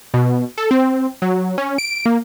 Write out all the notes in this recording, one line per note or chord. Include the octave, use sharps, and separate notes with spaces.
B2
A4
C4
F#3
C#4
D7
A#3